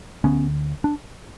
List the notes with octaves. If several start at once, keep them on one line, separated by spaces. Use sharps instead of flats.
D2 D3 B3 C#4
D4